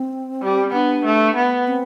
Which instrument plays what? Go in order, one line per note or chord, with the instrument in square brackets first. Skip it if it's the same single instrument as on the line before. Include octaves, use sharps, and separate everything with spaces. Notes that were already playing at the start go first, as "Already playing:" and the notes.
Already playing: [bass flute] C4
[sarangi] G3
[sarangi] B3 [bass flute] D4
[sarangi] A3
B3
[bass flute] C4